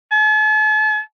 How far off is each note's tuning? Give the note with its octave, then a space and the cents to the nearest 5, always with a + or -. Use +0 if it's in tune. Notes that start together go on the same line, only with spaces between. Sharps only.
A5 -45